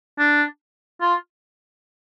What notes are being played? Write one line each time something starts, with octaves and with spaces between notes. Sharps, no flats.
D4
F4